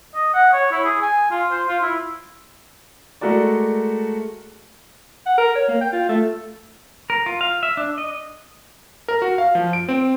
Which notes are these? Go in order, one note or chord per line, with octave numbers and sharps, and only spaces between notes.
D#5
F#5
C#5
E4
G#4
G#5
F4
C5
F4
E4
G#3 A3 F#4 A#4 D5
F#5
A#4
C#5
A#3
G5
F4
A3
A#4
F4
F5
E5
D4
D#5
A#4
F#4
F5
F3
D7
C4